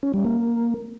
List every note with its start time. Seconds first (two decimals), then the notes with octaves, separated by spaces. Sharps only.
0.03 C#4
0.14 G3
0.25 A#3